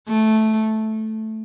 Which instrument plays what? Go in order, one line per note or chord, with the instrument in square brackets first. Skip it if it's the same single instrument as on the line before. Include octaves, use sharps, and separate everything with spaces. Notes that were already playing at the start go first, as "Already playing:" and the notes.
[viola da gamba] A3